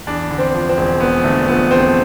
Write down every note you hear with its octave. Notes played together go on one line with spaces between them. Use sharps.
E2 D4
D3
C4
F3
C4
E1
E2 B3
D3 A3
F3 B3
E1 C4